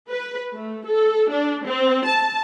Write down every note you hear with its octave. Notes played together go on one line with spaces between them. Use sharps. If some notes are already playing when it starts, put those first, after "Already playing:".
B4
A3
A4
D4
C4
A5